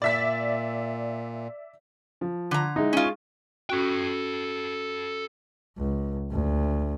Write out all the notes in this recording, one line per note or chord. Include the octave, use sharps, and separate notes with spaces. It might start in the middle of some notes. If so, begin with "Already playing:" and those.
A#2 D5 E5 B6
F3
D3 A#5
G#3 D#4 E4
C#4 F4
C#4 F#4 A4 G5
C#2
D2